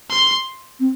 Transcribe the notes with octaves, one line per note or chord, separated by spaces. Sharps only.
C6
C4